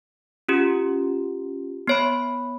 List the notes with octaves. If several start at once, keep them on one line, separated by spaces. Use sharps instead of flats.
C#4 F4 G4
B3 C#5 B5